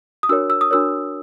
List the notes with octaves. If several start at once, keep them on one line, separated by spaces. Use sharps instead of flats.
D#6
D4 F#4 A#4 C#5 E6
E6
D#6
D4 F#4 A#4 C#5 E6